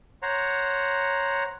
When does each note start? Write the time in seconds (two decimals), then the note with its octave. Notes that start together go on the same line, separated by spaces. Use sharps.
0.22 C5 C#5 F#5 A#5